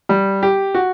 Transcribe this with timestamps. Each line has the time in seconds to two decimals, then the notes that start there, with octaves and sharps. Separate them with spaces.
0.09 G3
0.43 G4
0.75 F#4